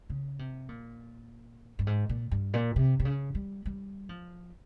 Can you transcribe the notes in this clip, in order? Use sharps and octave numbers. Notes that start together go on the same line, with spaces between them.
C#3
C3
A#2
G2
G#2
A#2
G2
A#2
C3
C3
C#3
G3
G3
F3